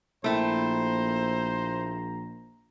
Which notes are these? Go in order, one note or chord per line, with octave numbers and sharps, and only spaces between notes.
A#1 A3 A#3 E4 C5 G5 A#5